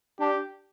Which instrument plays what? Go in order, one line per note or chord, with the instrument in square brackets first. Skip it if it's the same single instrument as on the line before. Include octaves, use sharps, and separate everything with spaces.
[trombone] D4 [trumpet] G4